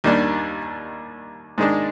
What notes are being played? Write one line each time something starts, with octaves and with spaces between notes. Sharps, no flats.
D#2 D#3 G3 D4
G#2 D#3 G#3 D4